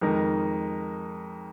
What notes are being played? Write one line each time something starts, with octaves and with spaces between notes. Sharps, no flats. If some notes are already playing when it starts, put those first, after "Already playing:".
F2 D#3 G#3 D#4 A#4